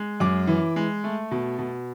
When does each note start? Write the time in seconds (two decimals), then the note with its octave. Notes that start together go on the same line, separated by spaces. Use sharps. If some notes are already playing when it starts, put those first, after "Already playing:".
Already playing: G#3
0.20 F#2 D6
0.47 E3
0.76 G#3
1.04 A3
1.31 B2
1.59 B2